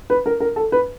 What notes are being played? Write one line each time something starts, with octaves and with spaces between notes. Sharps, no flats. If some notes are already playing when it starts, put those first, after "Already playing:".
B4
A#4
A#4
A4
B4